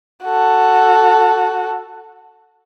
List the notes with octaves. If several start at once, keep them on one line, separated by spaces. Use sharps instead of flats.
F#4 A4